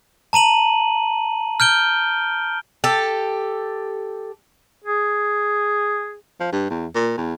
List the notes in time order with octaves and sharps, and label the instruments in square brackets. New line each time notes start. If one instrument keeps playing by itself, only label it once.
[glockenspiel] A5 A#5 D#7 F#7
F6 G6 D7 G7
[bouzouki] G4 A4
[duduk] G#4
[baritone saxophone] F3
G2
E2
A#2
E2